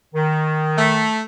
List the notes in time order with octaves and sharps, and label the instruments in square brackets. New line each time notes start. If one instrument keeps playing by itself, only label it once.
[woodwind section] D#3
[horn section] A3